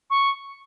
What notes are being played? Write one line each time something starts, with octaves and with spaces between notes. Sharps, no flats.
C#6